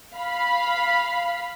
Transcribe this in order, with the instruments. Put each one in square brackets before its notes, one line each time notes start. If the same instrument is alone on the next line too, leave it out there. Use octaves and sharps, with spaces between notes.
[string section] F5 B5